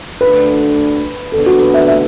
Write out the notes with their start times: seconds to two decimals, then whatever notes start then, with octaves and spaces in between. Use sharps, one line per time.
0.21 D2 D3 A3 D4 B4
1.32 E2 D3 B3 D4 A4
1.46 F#4
1.60 B4
1.74 E5
1.88 E5